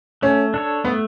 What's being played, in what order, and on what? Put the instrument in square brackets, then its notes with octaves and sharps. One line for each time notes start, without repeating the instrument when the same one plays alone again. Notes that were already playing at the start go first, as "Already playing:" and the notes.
[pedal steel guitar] A3 [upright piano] C#4
[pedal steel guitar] D4 A4 C#5
[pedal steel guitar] A3 [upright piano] B3